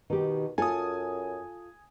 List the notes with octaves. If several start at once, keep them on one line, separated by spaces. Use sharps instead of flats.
B2 D#3 G4
F#2 F4 A4 G#5 D#6